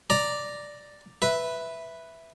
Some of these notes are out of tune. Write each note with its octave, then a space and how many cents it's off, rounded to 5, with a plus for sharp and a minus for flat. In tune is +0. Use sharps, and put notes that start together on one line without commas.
D5 +0 A#5 +0
B4 +0 E5 +0